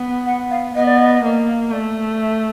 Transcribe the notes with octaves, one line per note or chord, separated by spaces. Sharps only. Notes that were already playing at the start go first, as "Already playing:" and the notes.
Already playing: B3
F#5
F5
B3 D#5
D5
D#5
A#3
A3 D5
E5